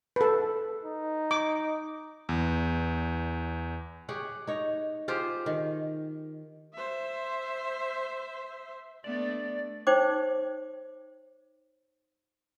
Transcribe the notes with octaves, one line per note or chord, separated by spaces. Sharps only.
A4 B4
D#4
D6
E2
G4 G#4 C#5 F#5
D#4 C#5
F4 G4 G#4 C5
D#3
C5 E5
A3 B3 D4 D5
D#4 C5 C#5 G5 D6